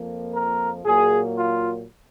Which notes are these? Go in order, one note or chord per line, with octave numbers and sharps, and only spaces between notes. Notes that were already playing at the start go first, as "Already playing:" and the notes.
Already playing: F2 F3 A#3
A#4
A#2 F#3 A#3 G#4
F4